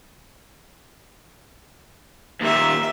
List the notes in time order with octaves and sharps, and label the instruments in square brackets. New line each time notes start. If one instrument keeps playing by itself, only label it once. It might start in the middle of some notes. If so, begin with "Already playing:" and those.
[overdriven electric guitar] D#2 A#2 [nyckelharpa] G4 E5